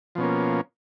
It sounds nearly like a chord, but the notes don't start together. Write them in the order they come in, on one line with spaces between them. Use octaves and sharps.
F3 B2 C#4 A#3